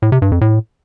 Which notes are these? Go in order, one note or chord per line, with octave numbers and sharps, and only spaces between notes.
A2
C3
G2
F2
A2